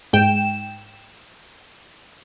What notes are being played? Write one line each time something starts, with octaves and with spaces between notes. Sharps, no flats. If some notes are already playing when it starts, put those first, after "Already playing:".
G#2 G5 E7